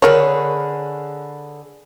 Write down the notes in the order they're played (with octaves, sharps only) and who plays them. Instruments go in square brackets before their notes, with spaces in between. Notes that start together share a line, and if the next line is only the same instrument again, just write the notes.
[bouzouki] D3 G#4 B4 [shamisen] A#4 C#5